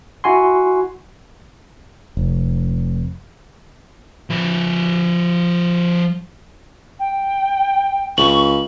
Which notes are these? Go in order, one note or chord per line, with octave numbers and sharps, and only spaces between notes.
E4 F#4 G#5 C6
F1
F3 B4
G5
C#2 C#6 F#7